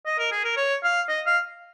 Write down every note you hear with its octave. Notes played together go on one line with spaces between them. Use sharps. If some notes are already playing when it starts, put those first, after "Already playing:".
D#5
A#4
G#4
A#4
C#5
F5
D#5
F5